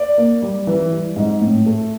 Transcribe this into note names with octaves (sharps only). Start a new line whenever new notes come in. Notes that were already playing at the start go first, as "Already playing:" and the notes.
Already playing: D5
A#3
G3
E3
G3
G#2
A2
A3